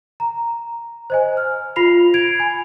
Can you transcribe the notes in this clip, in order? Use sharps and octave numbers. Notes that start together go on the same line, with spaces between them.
A#5
C5 D#5 G#5
F6
F4 B5 C7 F7
G#6 D7 F7
G#5 B5